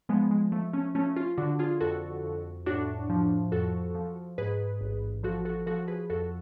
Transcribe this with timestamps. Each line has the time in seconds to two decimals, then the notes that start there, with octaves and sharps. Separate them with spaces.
0.09 F3 G#3 B3
0.31 G#3
0.52 F3 A3
0.73 A3 C#4
0.95 F3 A3 C#4
1.16 C#4 F4
1.38 D3 D4 F#4
1.59 F4 G#4
1.81 F2 F#4 A4
2.24 F2
2.66 A2 D4 F#4
3.09 F3
3.52 F2 F#4 A4
3.95 F3
4.38 G#2 G#4 B4
4.81 A1
5.23 F3 F#4 A4
5.45 F#4 A4
5.67 F3 F#4 A4
5.88 G#4 B4
6.10 F2 F#4 A4